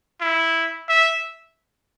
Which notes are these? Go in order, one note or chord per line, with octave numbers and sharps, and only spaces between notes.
E4
E5